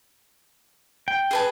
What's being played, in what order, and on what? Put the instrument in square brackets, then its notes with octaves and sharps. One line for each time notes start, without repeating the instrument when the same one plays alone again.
[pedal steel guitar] G5
[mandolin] G#4 B4 A5